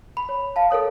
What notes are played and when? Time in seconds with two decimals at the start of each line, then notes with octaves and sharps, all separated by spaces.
0.17 B5
0.29 C#5
0.56 F5 A5
0.71 A4 A#4 C#5 D#6